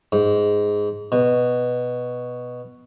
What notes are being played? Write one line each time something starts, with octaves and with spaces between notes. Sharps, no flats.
G#2
B2